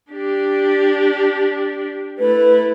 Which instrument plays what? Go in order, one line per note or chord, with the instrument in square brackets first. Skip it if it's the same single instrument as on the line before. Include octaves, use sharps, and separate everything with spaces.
[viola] D4 G4
[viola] A3 E4 [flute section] B4